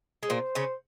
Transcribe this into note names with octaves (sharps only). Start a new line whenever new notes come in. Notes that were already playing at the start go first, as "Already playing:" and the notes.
G#3
A#2 A#3 C5
C#3 C#4